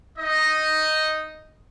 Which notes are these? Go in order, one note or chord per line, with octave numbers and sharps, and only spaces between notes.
D#4 D#5